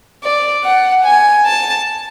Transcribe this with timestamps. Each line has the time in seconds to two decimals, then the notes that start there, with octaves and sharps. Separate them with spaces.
0.23 D5
0.64 F#5
1.05 G#5
1.46 A5